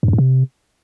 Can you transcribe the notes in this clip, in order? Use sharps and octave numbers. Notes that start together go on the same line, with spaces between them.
G2
F#2
G#2
C3